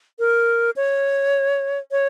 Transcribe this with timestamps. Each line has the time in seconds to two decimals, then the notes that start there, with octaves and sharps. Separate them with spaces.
0.19 A#4
0.76 C#5
1.91 C#5